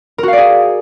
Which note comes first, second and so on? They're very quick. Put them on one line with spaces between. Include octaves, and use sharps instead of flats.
A#4 F#4 F5 D5 G#4